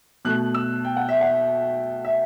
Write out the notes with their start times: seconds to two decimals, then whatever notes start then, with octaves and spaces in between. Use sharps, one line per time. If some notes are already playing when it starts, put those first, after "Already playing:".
0.25 B2 A3 F#6
0.54 E6
0.85 G5
0.97 F#5
1.09 E5
1.21 F#5
2.05 E5